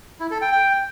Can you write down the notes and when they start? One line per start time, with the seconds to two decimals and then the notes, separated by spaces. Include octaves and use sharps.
0.20 E4
0.31 A4
0.42 G5
0.52 G5